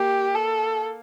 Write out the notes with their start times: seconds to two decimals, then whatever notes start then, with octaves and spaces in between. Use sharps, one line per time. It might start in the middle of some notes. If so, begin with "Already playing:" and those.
Already playing: A#3 G4
0.35 A4